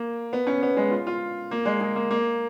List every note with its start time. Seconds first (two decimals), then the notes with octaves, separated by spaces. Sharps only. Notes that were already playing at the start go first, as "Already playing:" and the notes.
Already playing: A#3
0.33 B3
0.47 C#4
0.63 B3
0.77 G#3
0.91 F4
1.07 F4
1.51 A#3
1.65 G#3
1.81 G#3
1.96 A#3
2.11 A#3